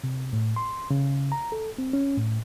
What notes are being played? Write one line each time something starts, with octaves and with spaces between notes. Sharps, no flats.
C3
A2
C6
C#3
A#5
A4
C4
C#4
A2